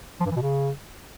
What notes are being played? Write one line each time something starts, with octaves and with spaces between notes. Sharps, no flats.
F3
G2
E3
B2
C#3